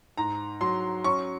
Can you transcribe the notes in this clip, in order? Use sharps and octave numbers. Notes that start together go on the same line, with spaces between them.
G#2 A#5
F#3 C6
C#4 C#6